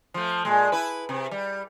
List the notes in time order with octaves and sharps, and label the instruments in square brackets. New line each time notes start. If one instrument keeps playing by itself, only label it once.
[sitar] F3 A3
A#2 G#3
E4 B4
C3
G3